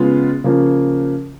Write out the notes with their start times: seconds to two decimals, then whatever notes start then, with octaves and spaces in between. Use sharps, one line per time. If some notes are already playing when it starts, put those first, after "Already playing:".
Already playing: C#3 G#3 B3 F4
0.44 C#3 F3 A#3